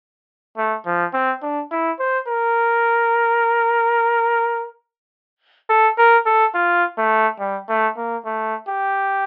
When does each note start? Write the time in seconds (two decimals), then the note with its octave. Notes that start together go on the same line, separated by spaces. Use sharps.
0.57 A3
0.86 F3
1.14 C4
1.42 D4
1.71 E4
1.99 C5
2.28 A#4
5.69 A4
5.98 A#4
6.26 A4
6.54 F4
6.98 A3
7.39 G3
7.69 A3
7.97 A#3
8.25 A3
8.69 G4